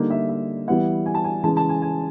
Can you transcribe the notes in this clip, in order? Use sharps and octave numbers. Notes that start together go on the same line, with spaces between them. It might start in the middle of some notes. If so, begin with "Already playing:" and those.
Already playing: D3 G3 A#3 D#4
E5
E5
E3 G3 B3 E4 F#5
G#5
A5
G#5
C#3 E3 G#3 A5
A5
G#5
G#5